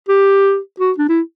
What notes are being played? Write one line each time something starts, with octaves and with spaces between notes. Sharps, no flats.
G4
F#4
D4
E4